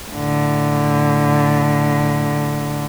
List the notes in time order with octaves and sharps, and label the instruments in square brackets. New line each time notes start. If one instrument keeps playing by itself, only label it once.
[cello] A2 D3